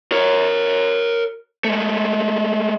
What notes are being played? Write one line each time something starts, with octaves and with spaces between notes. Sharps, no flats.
A#4 C#5
G#3 A3